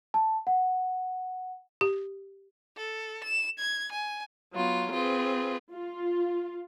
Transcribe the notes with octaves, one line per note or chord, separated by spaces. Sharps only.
A5
F#5
G4
A4
E7
G#6
G#5
F#3 B3 F4
C4 F4 G#4 B4
F4